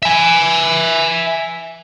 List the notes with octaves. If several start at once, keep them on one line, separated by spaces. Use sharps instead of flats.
E5 G#5